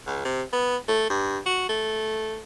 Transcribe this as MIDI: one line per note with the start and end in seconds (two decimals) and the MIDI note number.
0.07 0.23 37
0.25 0.42 48
0.52 0.76 59
0.88 1.07 57
1.10 1.38 43
1.46 1.64 66
1.69 2.40 57